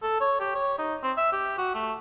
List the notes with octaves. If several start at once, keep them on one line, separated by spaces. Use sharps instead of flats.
A4
C#5
G4
C#5
D#4
C4
E5
G4
F#4
A3